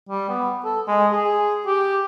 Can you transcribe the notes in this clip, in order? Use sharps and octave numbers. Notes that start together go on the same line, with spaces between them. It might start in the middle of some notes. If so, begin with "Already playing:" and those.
G3
B3
A4
G#3
G#4
G4